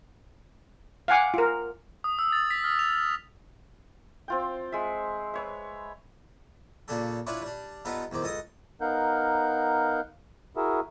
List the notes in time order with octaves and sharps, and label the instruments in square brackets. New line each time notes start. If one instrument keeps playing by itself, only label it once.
[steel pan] F5 F#5 G#5 D6
F4 A#4
[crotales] D#6
E6
A6
B6
F6
F7
[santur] C4 F4 G5
G#3 E5
B4 C#5 E5
[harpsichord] A#2 C#3 A#3 D4 G4 A4
D4 E4 F4 B4 C#5 D5
G3 D4
G2 B3 D#4 F4 A4 B4
E2 D#3 C4 D6
C#2 A4 D#5 D#6
[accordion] B3 D#4 A#4 F5 F#5 G6
E4 F#4 G#4 A#4 E5